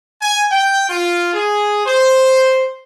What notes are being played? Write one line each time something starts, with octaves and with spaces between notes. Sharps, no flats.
G#5
G5
F4
G#4
C5